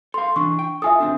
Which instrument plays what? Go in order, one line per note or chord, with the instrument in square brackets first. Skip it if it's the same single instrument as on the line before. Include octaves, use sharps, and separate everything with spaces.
[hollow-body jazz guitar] A4 F5 [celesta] C6
[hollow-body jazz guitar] E3 D4 [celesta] C#6
[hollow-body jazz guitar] G5
[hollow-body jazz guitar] F4 A4 [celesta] E5 G#5 D#6
[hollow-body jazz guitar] D#2 C4 D4